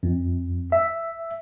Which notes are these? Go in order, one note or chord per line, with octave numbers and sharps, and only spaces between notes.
F2
E5